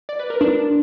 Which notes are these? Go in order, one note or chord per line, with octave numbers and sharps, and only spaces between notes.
D5
B4
A#4
D4